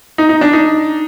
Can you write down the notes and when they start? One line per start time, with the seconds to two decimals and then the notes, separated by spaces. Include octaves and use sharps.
0.18 D#4
0.29 D#4
0.41 D4
0.53 D#4